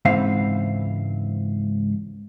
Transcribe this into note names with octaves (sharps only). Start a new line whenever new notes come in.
C#2 G#2 E3 C4 F5